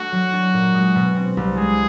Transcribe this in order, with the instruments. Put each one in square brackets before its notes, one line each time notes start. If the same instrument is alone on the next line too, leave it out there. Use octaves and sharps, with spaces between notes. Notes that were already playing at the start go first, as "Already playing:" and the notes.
Already playing: [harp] A3 D4 [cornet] F#4
[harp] F#3
D4
A#2
G#3
B2
C4
C2
[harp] G#3 [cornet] G#4